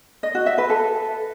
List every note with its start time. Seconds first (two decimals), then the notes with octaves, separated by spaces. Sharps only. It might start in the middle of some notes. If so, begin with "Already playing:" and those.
0.23 D#5
0.35 F#4
0.46 E5
0.58 B4
0.70 A4